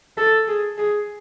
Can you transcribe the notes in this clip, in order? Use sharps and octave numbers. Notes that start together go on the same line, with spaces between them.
A4
G#4
G#4